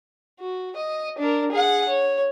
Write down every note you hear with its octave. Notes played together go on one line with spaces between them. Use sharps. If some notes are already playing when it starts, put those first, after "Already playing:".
F#4
D#5
D4 A#4
G#4 F#5
C#5